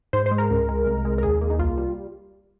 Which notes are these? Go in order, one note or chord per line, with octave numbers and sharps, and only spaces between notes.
G#2 C5
C5
G#3
A#4
C#2
G#3
C2
G#3
A#4
D#2 G#4
A#3
D#4
C2 F4
G3